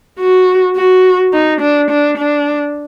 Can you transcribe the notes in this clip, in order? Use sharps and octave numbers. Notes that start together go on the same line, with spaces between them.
F#4
F#4
D#4
D4
D4
D4